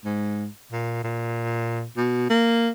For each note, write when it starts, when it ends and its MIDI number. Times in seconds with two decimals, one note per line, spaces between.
0.05 0.47 44
0.72 0.99 46
1.03 1.85 46
1.97 2.26 47
2.30 2.70 58